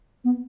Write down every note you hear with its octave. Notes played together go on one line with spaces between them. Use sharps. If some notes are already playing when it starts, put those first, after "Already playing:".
B3